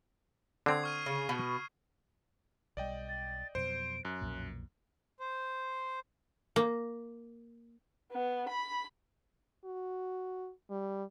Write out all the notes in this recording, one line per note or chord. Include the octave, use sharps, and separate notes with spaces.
D3 C4 D#6 G#6 C7
C#6 F6 D#7
C#3
B2
B1 G3 D5 D#5 G5
A6
F2 B2 F#3 C5 D7
F#2 F#6
B1 F2 A#2
C5
A#3
B3
B5
F#4
G3